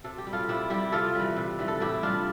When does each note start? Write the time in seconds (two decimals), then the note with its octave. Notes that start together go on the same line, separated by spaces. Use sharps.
0.04 C3 A4
0.18 G4
0.27 G3
0.33 F4 A4
0.48 C3 E4 G4
0.70 G3 E4 G4
0.92 C3 F4 A4
1.15 E3 G3
1.36 C3
1.59 E3 G3
1.68 A4
1.80 A2 E4 G4
2.03 G3 D4 F4